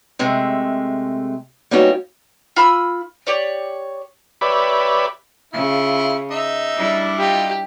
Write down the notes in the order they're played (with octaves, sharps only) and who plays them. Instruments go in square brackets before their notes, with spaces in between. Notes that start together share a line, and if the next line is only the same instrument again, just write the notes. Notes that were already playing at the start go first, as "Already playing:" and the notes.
[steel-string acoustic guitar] C3 G#3 A3
G3 A#3 B3 C#4 D#4 F#4
[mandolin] F4 B5 E6
G4 C#5 D5
[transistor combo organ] G4 B4 C#5 D5 E5 B5
[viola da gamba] C#3 [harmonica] E4 F4
[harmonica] D#4 E5
[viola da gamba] G3 D4 E4
[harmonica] D#4 F4 [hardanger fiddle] G4